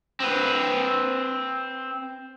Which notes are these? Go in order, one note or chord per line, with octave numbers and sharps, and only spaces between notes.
C4 B4